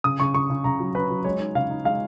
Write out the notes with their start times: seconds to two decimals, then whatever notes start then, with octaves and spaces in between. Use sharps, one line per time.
0.04 C#3 D#6
0.20 C#3 C#6
0.34 C#3 C#6
0.50 C#3
0.64 C#3 A#5
0.80 F#3
0.95 C#4 B4
1.10 F#3
1.25 G#3 C#5
1.40 D#4
1.55 C#3 F5
1.70 D#4
1.85 G#3 F5